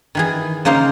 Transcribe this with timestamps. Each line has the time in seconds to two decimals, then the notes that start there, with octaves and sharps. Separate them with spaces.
0.15 D#3 E3 G#4
0.65 C#3 A#3 D#4 C5 F5